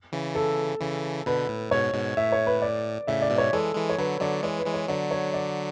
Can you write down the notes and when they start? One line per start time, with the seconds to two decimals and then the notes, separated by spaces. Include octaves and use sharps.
0.12 C#3 E3
0.35 A4
0.81 C#3 E3
1.26 B2 D3 B4
1.49 A2
1.71 G#2 B2 C#5
1.94 G#2 B2
2.17 A2 E5
2.32 C#5
2.47 B4
2.62 D5
3.07 A2 C#3 E5
3.22 D5
3.30 G#2 B2
3.38 C#5
3.53 E3 G#3 A4
3.75 E3 G#3
3.90 C#5
3.98 D3 F#3 B4
4.21 D3 F#3 D5
4.43 E3 G#3 C#5
4.59 B4
4.66 E3 G#3
4.74 C#5
4.88 D3 F#3 D5
5.11 C#5
5.34 D5